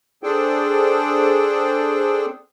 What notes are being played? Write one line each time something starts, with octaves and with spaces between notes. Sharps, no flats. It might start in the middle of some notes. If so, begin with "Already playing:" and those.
D4 G#4 A4 C5 G5